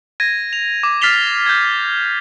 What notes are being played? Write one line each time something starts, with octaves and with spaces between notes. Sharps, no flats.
G#6 A#6 D#7
F7
D6
F6 A6 B6 C7 F7 G7
G6 G#6